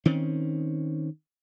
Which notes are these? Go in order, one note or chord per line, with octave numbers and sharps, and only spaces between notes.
D#3 C4 C#4